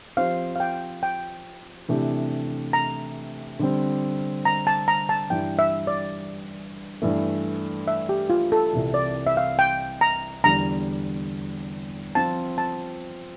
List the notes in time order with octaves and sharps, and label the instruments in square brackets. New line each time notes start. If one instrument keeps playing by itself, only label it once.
[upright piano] F3 C4 G4 C5 [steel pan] F5
[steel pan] F5
G5
G5
[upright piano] C3 E3 A3 D4 G4
[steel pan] A#5
[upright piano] D3 G3 C4
[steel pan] A#5
A5
A#5
A5
[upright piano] G2 E3 G3 [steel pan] G5
[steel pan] E5
D5
[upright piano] G2 E3 A3
[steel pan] E5
G4
F4
A4
[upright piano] C2 C3 E3
[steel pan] D5
E5
F5
G5
A#5
[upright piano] E2 D3 G3 [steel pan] A#5
[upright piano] F3 C4 F4 [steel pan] A5
[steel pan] A5